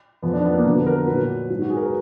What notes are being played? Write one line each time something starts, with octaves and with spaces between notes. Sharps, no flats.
F2 F3 B3
D4
B3
A#3
F2 D3 F#3 B3
B4
A#4
A#2 F#3 B4
G#2 F#3
F#4
G#4
A#4
B4